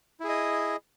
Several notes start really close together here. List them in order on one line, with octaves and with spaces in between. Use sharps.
E4 G#4 D#5